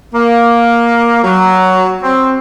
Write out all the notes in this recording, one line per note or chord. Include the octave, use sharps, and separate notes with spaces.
A#3
F#3
C4